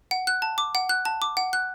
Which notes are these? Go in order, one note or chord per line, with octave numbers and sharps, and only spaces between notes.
F#5
F#6
A5
D6
F#5
F#6
A5
D6
F#5
F#6